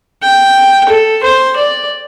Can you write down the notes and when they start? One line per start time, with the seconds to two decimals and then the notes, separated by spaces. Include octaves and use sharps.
0.22 G5
0.89 A4
1.23 C5
1.56 D5